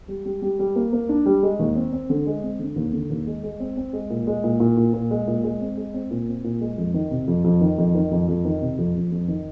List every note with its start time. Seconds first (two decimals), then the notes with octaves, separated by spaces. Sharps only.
0.08 G3
0.25 G3
0.42 G3
0.59 G3
0.76 A#3
0.93 A#3
1.09 D4
1.26 G3
1.43 G#3
1.59 D#2
1.76 C4
1.93 C4
2.10 D3
2.26 G#3
2.43 C4
2.59 D3
2.76 D#2
2.93 D3
3.10 D#2
3.27 G#3
3.43 G#3
3.60 C4
3.77 C4
3.93 G#3
4.10 A#2
4.27 G#3
4.44 A#2
4.60 A#2
4.77 A#2
4.93 A#2
5.11 G#3
5.27 A#2
5.44 G#3
5.60 C4
5.77 G#3
5.94 C4
6.11 A#2
6.27 C4
6.44 A#2
6.61 G#3
6.78 F2
6.94 D#3
7.11 C3
7.28 F2
7.44 F2
7.61 D#3
7.78 F2
7.95 D#3
8.11 F2
8.28 F2
8.45 D#3
8.62 C3
8.78 F2
8.95 F2
9.12 F2
9.28 D#3